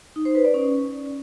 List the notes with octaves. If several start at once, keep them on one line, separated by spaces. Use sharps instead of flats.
D#4
C5
B4
D5
C#4